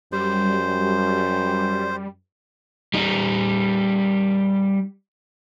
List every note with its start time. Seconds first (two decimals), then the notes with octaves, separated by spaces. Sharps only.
0.12 F#2 G3 C5
2.94 G3 D#4